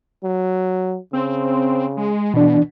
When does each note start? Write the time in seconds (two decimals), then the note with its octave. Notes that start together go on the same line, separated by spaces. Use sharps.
0.24 F#3
1.13 C#3 C4
1.97 G#3
2.34 B2 E3 D4